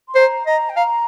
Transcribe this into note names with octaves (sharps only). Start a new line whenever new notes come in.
C6
C5 A#5
D#5 A#5
G5
F5 A#5